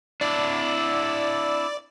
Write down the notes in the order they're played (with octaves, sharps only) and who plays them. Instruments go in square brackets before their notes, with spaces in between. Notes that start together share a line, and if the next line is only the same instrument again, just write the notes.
[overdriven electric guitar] D4 E4 [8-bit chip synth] D5